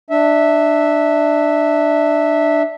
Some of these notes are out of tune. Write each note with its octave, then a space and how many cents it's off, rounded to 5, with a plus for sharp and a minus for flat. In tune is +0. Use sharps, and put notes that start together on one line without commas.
D4 +15 E5 -10